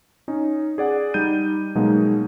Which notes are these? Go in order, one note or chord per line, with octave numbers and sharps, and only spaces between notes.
C#4 D#4
G#4 D5 F#5
G3 D#4 G6 D#7
B2 F#3 G#3 A#3 D#4